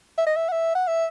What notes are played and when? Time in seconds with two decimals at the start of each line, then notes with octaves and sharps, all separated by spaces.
0.18 E5
0.27 D#5
0.36 E5
0.48 F#5
0.52 E5
0.75 F#5
0.88 E5